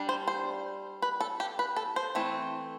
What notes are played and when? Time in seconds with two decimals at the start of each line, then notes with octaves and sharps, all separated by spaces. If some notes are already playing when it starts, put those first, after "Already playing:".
Already playing: G3 D4
0.09 C5
0.28 C5
1.02 B4
1.21 A4
1.40 G4
1.59 B4
1.76 A4
1.96 C5
2.15 E3 A3 C4